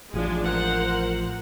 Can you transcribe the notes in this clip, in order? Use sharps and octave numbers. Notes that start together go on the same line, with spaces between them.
A1 F3 G#3 D4
A#4 C5 F#5